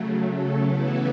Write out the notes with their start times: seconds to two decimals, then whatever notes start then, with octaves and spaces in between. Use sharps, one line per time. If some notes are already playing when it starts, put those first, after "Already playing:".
Already playing: C#3 F#3 A3
0.30 A4
0.63 C#3 E3 B3 E4